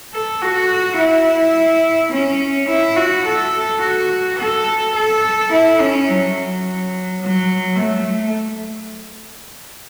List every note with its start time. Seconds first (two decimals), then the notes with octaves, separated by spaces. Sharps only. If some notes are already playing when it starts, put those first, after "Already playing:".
0.13 A4
0.41 F#4
0.99 E4
2.12 C#4
2.69 E4
2.96 F#4
3.25 A4
3.82 F#4
4.39 A4
4.95 A4
5.52 E4
5.80 C#4
6.09 F#3
7.21 F#3
7.78 A3